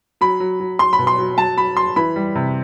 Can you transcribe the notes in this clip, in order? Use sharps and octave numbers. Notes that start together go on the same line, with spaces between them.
F#3 B5
F#3
F#3
F#3 C6
B5
B2
C6
F#3
F#3 A5
F#3 B5
F#3 C6
E3 B5
G3
C3